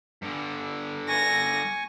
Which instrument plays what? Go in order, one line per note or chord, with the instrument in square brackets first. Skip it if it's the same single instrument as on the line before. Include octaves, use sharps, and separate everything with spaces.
[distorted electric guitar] G2 D3
[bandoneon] G#5 C#6 [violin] A#6